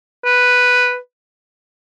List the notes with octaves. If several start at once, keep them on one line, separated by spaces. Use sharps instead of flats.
B4